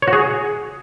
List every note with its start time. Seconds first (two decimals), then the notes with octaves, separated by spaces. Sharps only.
0.02 C#5
0.08 F#4
0.13 G#4